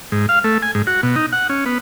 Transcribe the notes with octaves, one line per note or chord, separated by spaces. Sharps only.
G#2
F5
A3
G#5
G#2
F#4
B2
D#4
F#5
C#4
B3